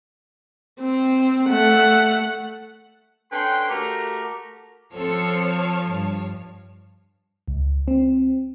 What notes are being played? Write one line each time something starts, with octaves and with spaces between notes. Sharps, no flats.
C4
A3 F#5
D3 C#4 B4 G5 C6
A3 F#4 G4 A#4
F3 C4 A4 C#5 A5
G2
C#2
C4